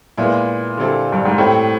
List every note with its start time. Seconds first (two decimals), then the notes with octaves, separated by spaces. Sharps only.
0.17 A#2 G#3 B3 E4
0.77 D3 G3 C4 E4 A4
1.12 G2
1.25 G#2
1.38 A2 C4 E4 G4